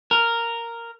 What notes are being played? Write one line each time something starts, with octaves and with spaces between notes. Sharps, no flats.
A#4